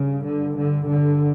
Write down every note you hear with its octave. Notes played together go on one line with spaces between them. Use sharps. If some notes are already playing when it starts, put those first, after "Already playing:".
Already playing: G2 C#3
D3
D3
D3